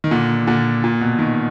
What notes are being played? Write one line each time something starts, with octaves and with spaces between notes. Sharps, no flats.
D#3
A#2 D3
A#2 D3
A#2
B2
B2 D#3